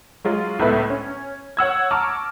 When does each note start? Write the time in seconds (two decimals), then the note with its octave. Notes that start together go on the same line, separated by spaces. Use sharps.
0.25 F#3 G#3 F4
0.59 C#2 A2 A3 B3 B4 E5
0.90 C#4
1.57 C#5 F#5 E6 G#6
1.91 A5 A#5 C#6 D6 E6 F6